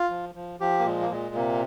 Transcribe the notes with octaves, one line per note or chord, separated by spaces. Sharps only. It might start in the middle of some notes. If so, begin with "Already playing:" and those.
Already playing: F4
F3
F3
F3 G4
A#3
A#2 G#3
A#3
A#2 G#3
C3 A#3